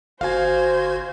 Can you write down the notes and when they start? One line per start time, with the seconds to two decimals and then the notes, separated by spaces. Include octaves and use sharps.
0.21 G1 F#4 C5 F5 G#5 G#6